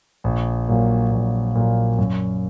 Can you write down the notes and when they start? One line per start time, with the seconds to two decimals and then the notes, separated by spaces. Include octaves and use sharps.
0.24 A#1
0.68 A#2 F#3 A#3
1.11 A#1
1.55 A#2 F#3 A#3
1.99 F#2